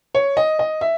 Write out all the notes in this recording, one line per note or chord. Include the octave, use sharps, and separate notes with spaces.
C#5
D#5
D#5
E5